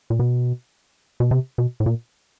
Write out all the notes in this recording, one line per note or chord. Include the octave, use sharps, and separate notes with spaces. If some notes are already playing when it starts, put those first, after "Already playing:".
A#2
B2
B2
C3
B2
A2
A#2